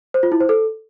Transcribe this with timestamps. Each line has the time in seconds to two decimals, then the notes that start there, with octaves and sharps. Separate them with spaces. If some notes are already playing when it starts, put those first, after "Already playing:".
0.14 C5
0.23 F4
0.32 E4
0.40 C5
0.49 A4